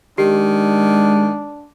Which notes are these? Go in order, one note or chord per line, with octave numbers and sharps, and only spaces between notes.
D#3 G#3 D4 G4